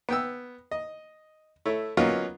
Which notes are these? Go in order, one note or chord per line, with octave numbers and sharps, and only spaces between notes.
B3 G5 E6
D#5
A3 E4 C#5
F#3 A#3 B3 C#4 D#4 F4